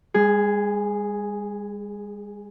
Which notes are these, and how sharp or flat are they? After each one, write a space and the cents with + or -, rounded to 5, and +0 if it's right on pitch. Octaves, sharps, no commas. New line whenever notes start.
G#3 -45 G#4 +0